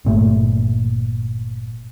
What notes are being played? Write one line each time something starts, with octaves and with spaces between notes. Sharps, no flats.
G1 A#2 A3